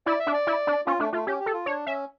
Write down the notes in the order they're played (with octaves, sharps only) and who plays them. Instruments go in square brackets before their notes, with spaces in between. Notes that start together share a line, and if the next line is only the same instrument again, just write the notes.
[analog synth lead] E4 [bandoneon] D5
[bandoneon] E5
[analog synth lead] D4
[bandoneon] D5
[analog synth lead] E4
D4
[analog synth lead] C#4 [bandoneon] F4
[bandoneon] A3 [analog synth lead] D4
[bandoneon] A3 [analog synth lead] F4
[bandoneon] C#4 [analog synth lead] G4
[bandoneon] G4
[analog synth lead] A4
[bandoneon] F4
[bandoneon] D4 [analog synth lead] C#5
[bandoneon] C#4 [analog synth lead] E5